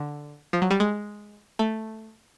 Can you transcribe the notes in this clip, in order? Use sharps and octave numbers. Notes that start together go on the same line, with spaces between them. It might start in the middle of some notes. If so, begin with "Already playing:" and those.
Already playing: D3
F3
F#3
G3
G#3
A3